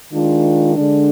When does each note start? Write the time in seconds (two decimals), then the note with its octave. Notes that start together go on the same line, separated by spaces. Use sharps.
0.12 D#3 G#3 D4 F4
0.76 D3 G#3 D4